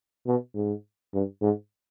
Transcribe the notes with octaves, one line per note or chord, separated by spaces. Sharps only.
B2
G#2
G2
G#2